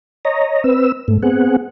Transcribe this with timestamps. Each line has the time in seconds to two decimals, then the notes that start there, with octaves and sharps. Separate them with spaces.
0.25 C#5 D#5 A#5
0.64 C4 B4 E6
1.08 G#2 A3
1.23 B3 C4 G#4 F#5